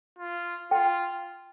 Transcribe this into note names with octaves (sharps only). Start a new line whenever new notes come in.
F4
F4 G5